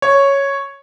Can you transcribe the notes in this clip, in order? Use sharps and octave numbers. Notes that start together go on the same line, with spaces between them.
C#5